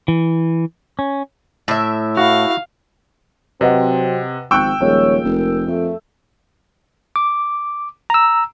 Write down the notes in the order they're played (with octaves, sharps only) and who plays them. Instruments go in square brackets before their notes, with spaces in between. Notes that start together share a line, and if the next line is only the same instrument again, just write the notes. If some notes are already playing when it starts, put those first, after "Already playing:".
[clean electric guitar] E3
C#4
[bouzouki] A2 E5
[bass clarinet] E4 [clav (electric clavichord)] F#4 [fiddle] F5
[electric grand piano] C3 [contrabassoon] F#3 [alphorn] C4 [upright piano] B4 D#5 F#5
[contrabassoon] G#1 [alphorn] F3 [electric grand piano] G5 E6 [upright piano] C#6 F#6 G6
[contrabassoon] D#1 [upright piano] F3 G#3 A#3 [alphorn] C#5
[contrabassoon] F1 [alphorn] A#4
[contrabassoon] F2 [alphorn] A3
[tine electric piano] D6
A#5 E6